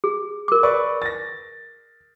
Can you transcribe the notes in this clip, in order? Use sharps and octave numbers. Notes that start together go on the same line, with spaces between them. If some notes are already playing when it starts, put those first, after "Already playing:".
G#4
A#4 D6
B4 D5 C#6
A6 A#6